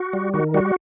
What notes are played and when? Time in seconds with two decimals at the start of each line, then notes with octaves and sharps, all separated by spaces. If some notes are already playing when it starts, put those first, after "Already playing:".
Already playing: F#4
0.13 G3
0.34 D#3 F#4
0.54 G3 F#4